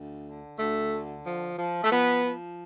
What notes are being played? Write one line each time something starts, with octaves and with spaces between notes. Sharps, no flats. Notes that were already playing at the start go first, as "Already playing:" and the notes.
Already playing: D2
D3
D2 A3
D3
F3
F3
A3
F3 B3
F3